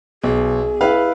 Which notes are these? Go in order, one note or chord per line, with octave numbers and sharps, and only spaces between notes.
B1 G#4
E4 B4 F5